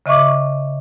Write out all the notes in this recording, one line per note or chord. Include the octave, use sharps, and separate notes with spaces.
C#3 D#5 E5 C#6 D6